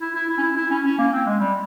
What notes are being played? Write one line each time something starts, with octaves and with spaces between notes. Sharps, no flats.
E4
E4
E4
C#4
E4
E4
C#4
C#4
A#3
C4
G#3
G3